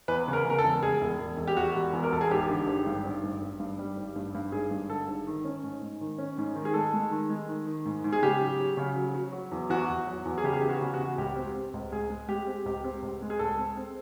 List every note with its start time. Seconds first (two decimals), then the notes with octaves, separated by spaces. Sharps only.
0.08 E2 B4
0.28 C#3
0.33 A#4
0.45 C#3 A#4
0.58 A4
0.65 E1
0.83 E1 G#4
1.02 E1
1.20 E1
1.38 E1
1.48 G4
1.57 E1 F#4
1.75 E1
1.93 E2
2.03 A#4
2.12 E1 A4
2.21 G#4
2.31 G#1 G4
2.49 D3
2.67 G#1
2.86 G2
3.05 G#1
3.23 G2
3.42 G#1
3.60 G2
3.79 G3
3.97 G#1
4.16 G2
4.35 G2
4.52 G#1 G#4
4.71 G2
4.89 D3 A4
5.08 G#1
5.27 D#3
5.45 C#4
5.64 G#2
5.82 G#2
6.01 D#3
6.18 C#4
6.38 G#2
6.56 D#3
6.65 G#4
6.74 G#3 A4
6.93 G#3
7.11 D#3
7.29 G#3
7.48 D#3
7.66 D#3
7.85 G#2
8.04 G#2
8.13 G#4
8.22 C#3 G4
8.41 F#3
8.59 F#3
8.77 C#3
8.96 F#3
9.14 F#3
9.33 F#3
9.52 E2
9.70 E2 F#4
9.89 E2
10.07 F#3
10.25 E2
10.38 G#4
10.44 C#3 G4
10.53 G#4
10.61 E2 G4
10.69 F#4
10.81 C#3
10.94 F#4
10.99 E2
11.18 C#2 G4
11.36 C4
11.56 C4
11.74 C#2
11.92 C#2 G#4
12.10 G#3
12.28 G#3 G4
12.47 C4
12.65 C#2 G4
12.84 C4
13.02 C#2
13.22 G#3
13.30 G#4
13.39 C#2 A4
13.59 C4
13.77 C4